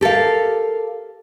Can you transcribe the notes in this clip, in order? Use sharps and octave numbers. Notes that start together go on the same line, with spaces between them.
G4 A4 A#4 F5